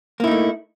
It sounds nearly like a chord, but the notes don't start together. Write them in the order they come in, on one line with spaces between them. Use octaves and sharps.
A#3 E4 D#4 A3